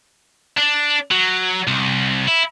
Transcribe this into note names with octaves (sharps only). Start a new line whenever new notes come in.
D4
F#3
C2
E4